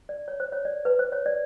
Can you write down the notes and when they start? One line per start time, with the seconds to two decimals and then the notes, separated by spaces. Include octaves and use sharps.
0.09 D5
0.28 C#5
0.40 C5
0.52 C#5
0.65 D5
0.85 B4
0.99 C5
1.12 C#5
1.26 D5